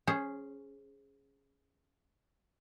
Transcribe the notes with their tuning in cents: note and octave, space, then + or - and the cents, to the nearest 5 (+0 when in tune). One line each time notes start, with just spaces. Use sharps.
C#4 +0 G#4 +0 C5 +25